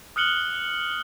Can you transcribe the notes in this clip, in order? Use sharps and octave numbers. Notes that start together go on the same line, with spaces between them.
D#6 F6 F#6 C#7 F#7 G7